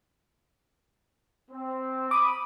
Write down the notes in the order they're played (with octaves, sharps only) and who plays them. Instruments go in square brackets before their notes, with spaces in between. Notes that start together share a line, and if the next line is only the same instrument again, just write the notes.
[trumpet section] C4
[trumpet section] B5 D#6 [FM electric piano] D6